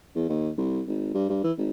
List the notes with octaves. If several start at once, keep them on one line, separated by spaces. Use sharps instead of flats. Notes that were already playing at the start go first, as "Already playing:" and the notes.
E2
D#2
C2
G#1
G2
G2
E3
G#1